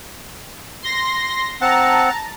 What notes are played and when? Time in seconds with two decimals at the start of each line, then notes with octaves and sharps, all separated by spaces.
0.83 C6 A#6
1.61 C4 F#5 A5 A#5